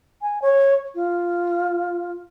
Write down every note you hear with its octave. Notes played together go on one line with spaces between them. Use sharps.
G#5
C#5
F4